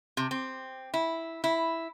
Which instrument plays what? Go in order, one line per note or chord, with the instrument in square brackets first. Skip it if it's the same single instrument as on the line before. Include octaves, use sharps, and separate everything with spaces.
[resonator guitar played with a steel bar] C3
C4
E4
E4